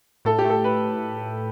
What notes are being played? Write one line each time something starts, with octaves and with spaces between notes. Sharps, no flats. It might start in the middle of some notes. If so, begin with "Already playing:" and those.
A2 A4
G4
A3
A4
B4